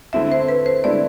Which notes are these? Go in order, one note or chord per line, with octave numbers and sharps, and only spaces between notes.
D3 A3 C4 E4 E5
C5
B4
C5
D3 A3 C4 E4 D5